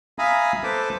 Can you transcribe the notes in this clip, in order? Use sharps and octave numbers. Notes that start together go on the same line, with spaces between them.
E5 F5 G#5 A#5 B5 D#6
A4 B4 C5 A5 D6